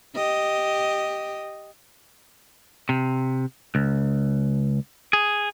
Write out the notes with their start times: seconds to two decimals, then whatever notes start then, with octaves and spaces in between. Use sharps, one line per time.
0.15 G4 D#5
2.89 C3
3.75 C#2
5.13 G#4